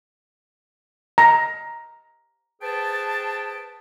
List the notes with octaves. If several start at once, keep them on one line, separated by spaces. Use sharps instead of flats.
A#5
G#4 B4 C5 G5 A5